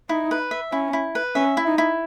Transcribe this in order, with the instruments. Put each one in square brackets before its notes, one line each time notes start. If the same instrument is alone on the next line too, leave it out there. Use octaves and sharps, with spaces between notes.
[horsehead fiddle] D#4 [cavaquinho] E4
[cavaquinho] B4
E5
[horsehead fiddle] C#4 [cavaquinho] E4
[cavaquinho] E4
B4
[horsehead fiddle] C#4 [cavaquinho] E5
[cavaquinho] E4
[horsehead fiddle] D#4
[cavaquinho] E4